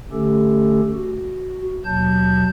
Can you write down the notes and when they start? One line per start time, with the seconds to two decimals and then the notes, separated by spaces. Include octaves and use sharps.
0.12 D3 A3 C#4 G4 A4
0.94 F#4
1.85 D#2 B2 F#3 A5 G6